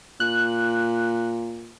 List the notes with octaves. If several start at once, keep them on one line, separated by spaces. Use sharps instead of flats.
A#2 F#6